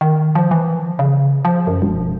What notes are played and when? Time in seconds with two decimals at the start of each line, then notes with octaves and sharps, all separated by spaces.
0.01 D#3
0.35 F3
0.51 E3
0.99 C#3
1.45 F3
1.67 F#2
1.82 E1